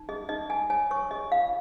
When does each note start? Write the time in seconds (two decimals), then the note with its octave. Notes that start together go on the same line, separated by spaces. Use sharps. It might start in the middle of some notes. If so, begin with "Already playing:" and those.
Already playing: D#4
0.09 G#4 D#5
0.29 D#4 D#5
0.50 G#4 G#5
0.70 C#5 G#5
0.91 C#5 C#6
1.11 G#4 D#5
1.31 F4 F5